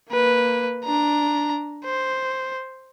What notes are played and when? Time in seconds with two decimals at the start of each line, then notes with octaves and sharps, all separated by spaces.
0.10 A#3 B4
0.85 D4 A#5
1.84 C5